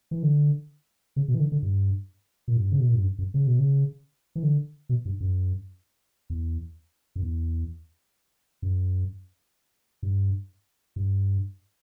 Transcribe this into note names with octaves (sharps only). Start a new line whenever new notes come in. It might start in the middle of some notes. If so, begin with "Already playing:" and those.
E3
D3
C#3
B2
E3
D3
D3
G2
A#2
G2
C#3
B2
A#2
G2
F#2
F#2
C#3
B2
C#3
E3
D3
B2
G2
F#2
E2
F#2
E2
F#2
G2
G2